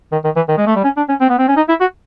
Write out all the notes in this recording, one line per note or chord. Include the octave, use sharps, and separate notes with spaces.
D#3
D#3
E3
D#3
G#3
A3
G3
C#4
D4
C#4
C4
B3
C4
C#4
D#4
E4
F#4